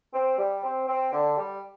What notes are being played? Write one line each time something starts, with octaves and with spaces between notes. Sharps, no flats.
C4
G3
C4
C4
D3
G3